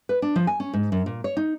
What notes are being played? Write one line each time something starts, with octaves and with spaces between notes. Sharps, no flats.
B4
D4
F3
G#5
C#4
G#2
F#2
A#2
C#5
D#4